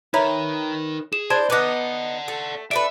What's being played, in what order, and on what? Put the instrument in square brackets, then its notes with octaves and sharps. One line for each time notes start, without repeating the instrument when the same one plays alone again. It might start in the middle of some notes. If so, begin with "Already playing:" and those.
[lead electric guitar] D#4 A#4 [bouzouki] B4 [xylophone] C#5 E5 A#5
[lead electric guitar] G#4 [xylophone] E7
[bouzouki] D4 E4 C5 [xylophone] A5 G#6
[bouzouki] B3 D#4 [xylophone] B4 D6 F#6 [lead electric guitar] D5 F#5
[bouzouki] A3
[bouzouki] D4 A4 B4 [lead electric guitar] E5 [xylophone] D7